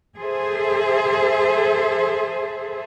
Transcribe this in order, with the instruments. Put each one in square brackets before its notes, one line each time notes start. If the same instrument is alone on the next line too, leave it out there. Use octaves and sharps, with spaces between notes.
[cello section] G#4 A4 C5 E5